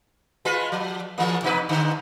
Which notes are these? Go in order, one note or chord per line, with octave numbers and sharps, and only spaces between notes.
G#3 F4 B4
F3
E3 G#3 A#3
B2 D#4 B4
G#2 D3